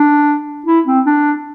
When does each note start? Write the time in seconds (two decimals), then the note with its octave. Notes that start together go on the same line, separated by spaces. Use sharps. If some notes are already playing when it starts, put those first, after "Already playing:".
Already playing: D4
0.66 E4
0.86 C4
1.06 D4